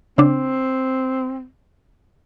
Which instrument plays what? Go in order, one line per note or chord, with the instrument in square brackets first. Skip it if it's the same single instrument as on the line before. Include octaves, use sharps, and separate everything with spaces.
[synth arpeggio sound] C#3 D4 [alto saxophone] C4